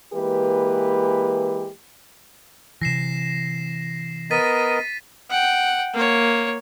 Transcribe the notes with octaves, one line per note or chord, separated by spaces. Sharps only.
E3 G#3 A#3 G4 B4
C3 E3 A#6 C7 E7
B3 A#4 D#5 A6 B6 D#7
F#5 G5
A#3 C#5